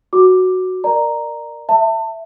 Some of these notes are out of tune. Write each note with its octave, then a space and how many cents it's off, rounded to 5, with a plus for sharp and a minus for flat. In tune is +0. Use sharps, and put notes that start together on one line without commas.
F#4 +0 D6 +5
A#4 +0 D5 +25 A#5 +0
E5 +0 A5 +35